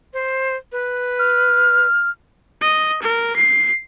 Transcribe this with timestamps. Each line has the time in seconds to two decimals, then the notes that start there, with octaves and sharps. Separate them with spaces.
0.13 C5
0.72 B4
1.19 F6
2.61 D#5
3.02 A#4
3.36 C7